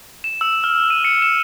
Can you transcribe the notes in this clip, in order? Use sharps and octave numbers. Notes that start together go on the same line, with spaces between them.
E7
E6
F6
D#7
C#7
E7